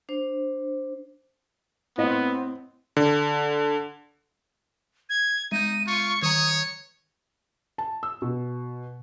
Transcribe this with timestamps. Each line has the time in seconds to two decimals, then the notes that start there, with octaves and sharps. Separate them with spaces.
0.09 D4 C5
1.98 A2 B3 C4 D#5
2.97 D3
5.09 G#6
5.52 G#3 D#4 G6 D#7
5.87 F4 C#6
6.23 D#3 C#5 A#5 D#6
7.78 A5
8.03 E6
8.22 B2